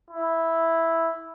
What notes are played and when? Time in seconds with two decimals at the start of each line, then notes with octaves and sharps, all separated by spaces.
0.11 E4